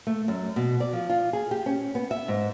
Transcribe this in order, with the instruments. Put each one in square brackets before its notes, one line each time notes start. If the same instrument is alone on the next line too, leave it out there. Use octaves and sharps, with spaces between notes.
[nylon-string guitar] A3
F#2
B2
D5
F3
F4
G#4
G4
C#4
B3
E5
G#2